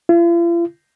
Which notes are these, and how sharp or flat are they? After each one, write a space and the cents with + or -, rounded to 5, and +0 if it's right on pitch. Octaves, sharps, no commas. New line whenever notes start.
F4 -45